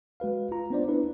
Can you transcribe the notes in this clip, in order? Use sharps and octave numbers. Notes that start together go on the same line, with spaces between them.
G#3 F#4 B4 F5
F4 A#5
B3 D4 C5 D5
D4 E4 B4